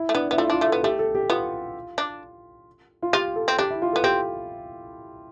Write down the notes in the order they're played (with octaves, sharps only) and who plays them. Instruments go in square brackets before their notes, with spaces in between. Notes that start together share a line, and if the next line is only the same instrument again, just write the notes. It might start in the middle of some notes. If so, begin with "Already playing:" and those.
Already playing: [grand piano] E4
[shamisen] A3
[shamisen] B3 [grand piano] D4
[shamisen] B3 [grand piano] E4
[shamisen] A3 [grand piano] F4
[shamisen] D4 [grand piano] F4
[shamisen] A3
[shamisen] B3 [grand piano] A4
[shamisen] A3 [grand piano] G4
[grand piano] A4
G4
[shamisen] B3 [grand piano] F4
[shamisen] D4
[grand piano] F4
[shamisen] F4 [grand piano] G4
[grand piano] A4
[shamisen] C4
[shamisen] D4 [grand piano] G4
[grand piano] E4
F4
[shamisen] B3 [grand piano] A4
[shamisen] C4 [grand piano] G4